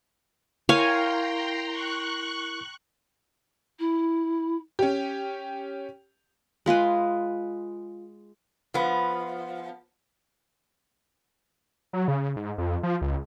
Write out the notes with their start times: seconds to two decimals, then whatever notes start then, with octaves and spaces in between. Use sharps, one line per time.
0.69 E4 A#4 C#5 F5 G5 G#5 A#5 C6
1.71 C#6 F#6
3.79 E4
4.79 C#4 G4
6.66 G#3 F4 G#4 B4
8.74 F3 B3
11.93 F#3
12.08 C#3
12.36 G#2
12.58 F2
12.83 F3
13.01 C#2